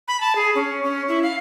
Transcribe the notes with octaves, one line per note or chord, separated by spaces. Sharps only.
B5
A5
G#4
C#4
C#4
E4
F5